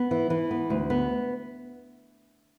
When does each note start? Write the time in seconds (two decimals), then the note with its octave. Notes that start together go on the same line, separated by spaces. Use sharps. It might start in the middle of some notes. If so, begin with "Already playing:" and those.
Already playing: B3
0.11 E3
0.30 E3
0.51 B3
0.70 D2
0.90 B3